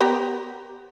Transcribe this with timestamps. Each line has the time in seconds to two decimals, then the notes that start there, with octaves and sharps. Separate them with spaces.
0.01 B3 G4 A#4